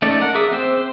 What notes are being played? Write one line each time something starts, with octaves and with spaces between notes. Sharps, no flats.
A3 C#4 D#4 A4 D5
A#4 F#5
G#4 A#4 E5 D6 D#6
C4 C5 E6
C5